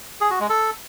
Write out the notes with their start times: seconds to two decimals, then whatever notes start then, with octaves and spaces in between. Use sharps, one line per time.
0.21 G#4
0.30 F#4
0.40 G#3
0.49 A4